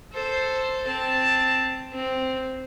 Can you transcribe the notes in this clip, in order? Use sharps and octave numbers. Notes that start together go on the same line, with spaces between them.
A4 C5
C4 A5
C4